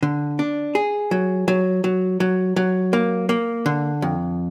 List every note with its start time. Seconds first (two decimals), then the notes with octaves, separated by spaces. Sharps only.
0.03 D3
0.39 D4
0.75 G#4
1.11 F#3
1.48 F#3
1.84 F#3
2.20 F#3
2.56 F#3
2.93 A#3
3.29 A#3
3.66 D3
4.02 F2